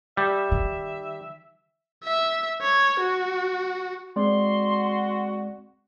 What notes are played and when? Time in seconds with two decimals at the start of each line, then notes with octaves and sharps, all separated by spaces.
0.17 G3 E5
0.52 D#3
2.04 E5
2.62 C#5
3.00 F#4
4.16 G#3 C4 F#4 D5 C6